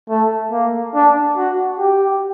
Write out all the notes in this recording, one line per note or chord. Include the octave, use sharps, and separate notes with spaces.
A3
A#3
D4
F#4
G4